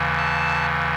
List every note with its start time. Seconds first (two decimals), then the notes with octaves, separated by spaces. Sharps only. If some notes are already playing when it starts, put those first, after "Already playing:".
Already playing: D#2 C#3 E3
0.17 A5